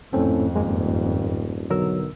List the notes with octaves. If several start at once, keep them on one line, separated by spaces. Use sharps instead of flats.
G#1 F2 A2 C4 C#4 A4
D#1 F#2 G#3 A#3
B1 D3 F#3 A#4 E6